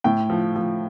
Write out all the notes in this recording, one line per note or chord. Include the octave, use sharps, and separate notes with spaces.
A2 G5
F3
F3